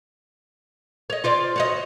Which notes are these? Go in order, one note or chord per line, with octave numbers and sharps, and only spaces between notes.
C#5 D#5
F4 C5 D5
F#4 C#5 D#5